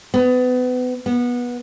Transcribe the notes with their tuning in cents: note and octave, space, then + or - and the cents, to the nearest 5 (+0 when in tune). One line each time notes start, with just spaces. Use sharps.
B3 +30
B3 -20